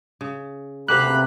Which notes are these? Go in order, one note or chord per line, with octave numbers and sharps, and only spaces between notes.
C#3
D2 G2 C3 A#3 G4 F5 B5 F#6